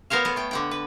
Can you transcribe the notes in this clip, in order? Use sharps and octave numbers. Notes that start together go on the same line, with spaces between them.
B3 A#4 C5 C#5 F5
B3 A4
A3 G5
D3 F#5 G5
B4